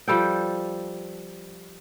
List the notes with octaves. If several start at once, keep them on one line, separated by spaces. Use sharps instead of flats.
F3 G3 A4 G5